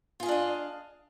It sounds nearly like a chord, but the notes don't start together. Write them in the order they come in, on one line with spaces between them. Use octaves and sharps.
F4 G#4 F5 D4 D#5